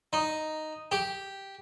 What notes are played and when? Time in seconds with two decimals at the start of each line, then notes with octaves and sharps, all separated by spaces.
0.13 D#4
0.92 G4